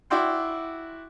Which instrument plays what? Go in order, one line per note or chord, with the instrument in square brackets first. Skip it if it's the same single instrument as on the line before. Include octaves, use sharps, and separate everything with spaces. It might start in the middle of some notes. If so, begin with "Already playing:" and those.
[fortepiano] E4 F#4 D5 G5 C6